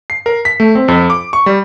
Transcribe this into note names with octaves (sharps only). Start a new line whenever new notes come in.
C7
A#4
B6
A3
C4
F2
D6
C#6
G3